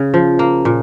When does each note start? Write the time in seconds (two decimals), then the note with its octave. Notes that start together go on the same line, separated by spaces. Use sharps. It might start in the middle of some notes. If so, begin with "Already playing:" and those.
Already playing: C#3
0.14 F3
0.39 A#3
0.65 A#2